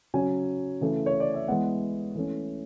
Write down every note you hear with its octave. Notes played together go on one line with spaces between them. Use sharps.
C#3 F#3 C#4 G#5
C#3 E3 A3
C#5
D5
E5
E3 G#3 B3 F#5
E3 A3 C#4